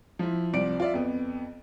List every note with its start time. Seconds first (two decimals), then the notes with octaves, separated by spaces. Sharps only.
0.19 F3 E4
0.53 C2 F3 D5 D7
0.80 F4 D5 E5
0.94 F2 B3